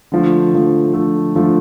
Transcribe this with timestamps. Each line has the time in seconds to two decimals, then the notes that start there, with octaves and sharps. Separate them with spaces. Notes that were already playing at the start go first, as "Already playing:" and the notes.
0.12 D3 F3 A3
0.53 D3 F3 A3
0.94 D3 F3 A3
1.35 D3 F3 A3